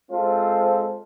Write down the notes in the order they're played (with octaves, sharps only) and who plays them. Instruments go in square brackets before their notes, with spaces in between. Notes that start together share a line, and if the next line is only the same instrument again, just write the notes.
[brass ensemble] G#3 C4 F4 A4 C5